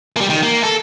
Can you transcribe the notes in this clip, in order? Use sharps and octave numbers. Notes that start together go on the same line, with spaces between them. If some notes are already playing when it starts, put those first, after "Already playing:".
G3 A#3
D#3
A#3
A4